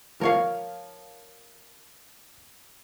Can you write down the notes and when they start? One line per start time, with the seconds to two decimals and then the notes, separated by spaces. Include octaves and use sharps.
0.21 F3 A#4 C#5 F5